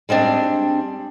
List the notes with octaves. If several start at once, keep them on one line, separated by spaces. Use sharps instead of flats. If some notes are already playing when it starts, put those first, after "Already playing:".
G3 G#3 C4 D4